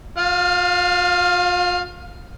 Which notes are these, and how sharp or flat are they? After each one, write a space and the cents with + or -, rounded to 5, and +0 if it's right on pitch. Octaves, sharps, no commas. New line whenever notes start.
F4 +40 F5 +5